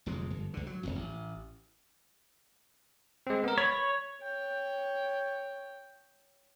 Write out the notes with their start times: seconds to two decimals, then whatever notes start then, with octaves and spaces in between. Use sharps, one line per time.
0.06 D1 F2 C3 G#3
0.30 G1
0.54 C#2 D3
0.67 F#3
0.83 E1 A#1 F2
0.96 A1
3.27 G#3 C4
3.44 B3 A#4
3.58 C#5 B5
4.21 C#5 G5